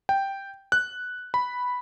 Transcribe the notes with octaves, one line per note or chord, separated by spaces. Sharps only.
G5
F#6
B5